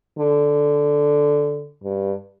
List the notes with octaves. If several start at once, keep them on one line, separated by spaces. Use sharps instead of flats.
D3
G2